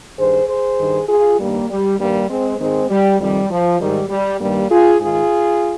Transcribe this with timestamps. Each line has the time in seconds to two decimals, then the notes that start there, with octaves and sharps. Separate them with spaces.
0.18 G2 D#3 G#4 C5
0.48 G#4 C5
0.78 G2 D#3
1.09 F4 G#4
1.38 G2 D#3 G3 A#3
1.69 G3
1.99 G2 D#3 G3 A#3
2.29 G#3 C4
2.59 G#2 D#3 G#3 C4
2.89 G3
3.19 F2 C3 D#3 G3
3.50 F3
3.80 G#2 D#3 G3
4.09 G3
4.40 G2 D#3 G3 A#3
4.70 F4 G#4
5.00 G#2 D#3 F4 G#4